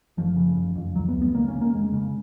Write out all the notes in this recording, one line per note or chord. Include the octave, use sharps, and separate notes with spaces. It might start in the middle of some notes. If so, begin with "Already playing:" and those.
F#1 F3
C#3
F#1
F2
C#2 F#3
B3
C#2
B3
C#3 A#3
C#4
C#3
A#3
F1 G#3
C#3